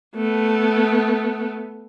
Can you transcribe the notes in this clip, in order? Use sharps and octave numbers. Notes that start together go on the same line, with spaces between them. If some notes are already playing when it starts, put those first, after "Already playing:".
A3 B3